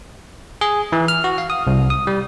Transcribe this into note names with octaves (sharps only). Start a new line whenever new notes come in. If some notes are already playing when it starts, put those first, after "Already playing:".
G#4
E3
F6
F#4
F5
D#6
C2
D#6
G3